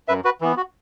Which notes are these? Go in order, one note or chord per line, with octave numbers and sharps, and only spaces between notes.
F#2 B4 E5
F#4 B4
E3 B3
F#4